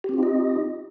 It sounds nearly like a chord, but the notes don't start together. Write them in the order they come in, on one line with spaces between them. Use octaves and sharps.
G4 C4 F4 D#4 D#5